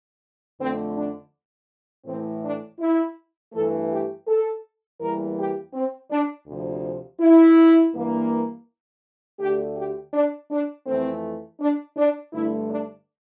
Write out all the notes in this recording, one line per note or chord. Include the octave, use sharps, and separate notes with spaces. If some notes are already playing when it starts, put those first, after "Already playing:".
F2 D3 A3 C4
D4
A2 E3 A3 C4
D4
E4
G2 E3 A3 A4
G4
A4
E2 E3 G3 A#3 A#4
G4
C4
D4
D2 C3 F3
E4
G2 E3 A#3
D2 D3 A3 G4
G4
D4
D4
F2 E3 A3 C4
D4
D4
G2 D3 A3 E4
D4